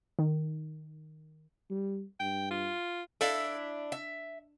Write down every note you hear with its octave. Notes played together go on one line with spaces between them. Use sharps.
D#3
G3
G2 G5
F4
D4 E4 A4 D5 E5 F5
E5